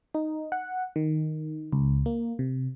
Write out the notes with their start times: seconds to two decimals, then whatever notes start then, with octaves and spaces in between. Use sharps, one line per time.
0.15 D#4
0.52 F#5
0.96 D#3
1.73 C#2
2.06 A#3
2.39 C3